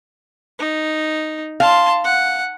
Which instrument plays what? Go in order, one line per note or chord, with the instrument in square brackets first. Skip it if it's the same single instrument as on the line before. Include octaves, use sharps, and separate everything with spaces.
[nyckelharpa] D#4
[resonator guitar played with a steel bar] F5 [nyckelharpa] A5 C6
[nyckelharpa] F#5